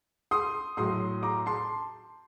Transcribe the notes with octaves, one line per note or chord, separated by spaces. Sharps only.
C6 D#6
A2 F#3 C6 D#6
A#5 D6
A5 C6